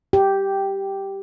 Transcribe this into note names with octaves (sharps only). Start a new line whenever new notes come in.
G4